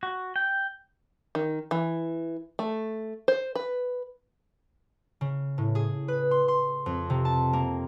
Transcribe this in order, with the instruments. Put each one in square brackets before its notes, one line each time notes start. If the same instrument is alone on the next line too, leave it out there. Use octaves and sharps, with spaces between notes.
[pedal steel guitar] F#4
G5
[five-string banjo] D#3
E3
A3
C5
B4
[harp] C#3
A2
G#4
B4
C6
C6
F2
C3
A5
A#3